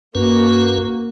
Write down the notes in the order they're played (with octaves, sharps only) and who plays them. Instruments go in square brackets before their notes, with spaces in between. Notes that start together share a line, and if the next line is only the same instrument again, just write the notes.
[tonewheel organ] G2 C#4 B4 [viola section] A#3 F#4